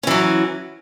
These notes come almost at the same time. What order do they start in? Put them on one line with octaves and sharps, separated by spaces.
C#4 E3 F#3